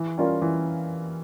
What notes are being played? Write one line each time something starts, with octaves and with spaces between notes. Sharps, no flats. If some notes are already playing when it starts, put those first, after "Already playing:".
Already playing: E3
G3 C#4 F4 A#4
E3